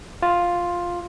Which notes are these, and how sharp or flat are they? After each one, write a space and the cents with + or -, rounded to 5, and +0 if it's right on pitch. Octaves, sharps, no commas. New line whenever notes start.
F4 +5